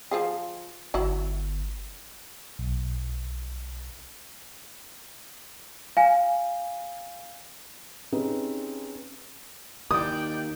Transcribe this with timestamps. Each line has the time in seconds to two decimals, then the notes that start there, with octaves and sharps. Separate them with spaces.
0.11 F3 F4 G#4
0.94 G1 F#3 E4
2.59 B1
5.97 F5 G#5
8.12 C4 C#4 D#4 G4 G#4 B4
9.91 D#2 D#4 D5 G5 D#6